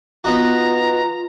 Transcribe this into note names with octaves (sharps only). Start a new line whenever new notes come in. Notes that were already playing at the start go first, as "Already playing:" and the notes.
B3 D#4 F4 F#4 A#5